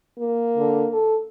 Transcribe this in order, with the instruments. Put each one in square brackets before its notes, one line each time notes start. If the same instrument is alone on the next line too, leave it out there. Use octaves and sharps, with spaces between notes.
[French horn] A#3
[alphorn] D3
A4